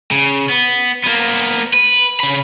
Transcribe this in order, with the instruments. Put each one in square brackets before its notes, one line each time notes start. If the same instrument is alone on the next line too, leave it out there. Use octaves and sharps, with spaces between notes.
[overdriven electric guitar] C#3
B3
A#3 B3
B4
C#3 B5